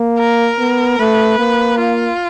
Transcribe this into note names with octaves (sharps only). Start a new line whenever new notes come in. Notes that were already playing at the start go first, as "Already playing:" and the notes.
Already playing: A#3
A#4
B3
A3 B4
A#3
F4